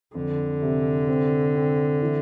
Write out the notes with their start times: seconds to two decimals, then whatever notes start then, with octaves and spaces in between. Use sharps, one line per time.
0.15 F2 D3
0.62 C3
1.08 C4
1.55 C4
2.02 E3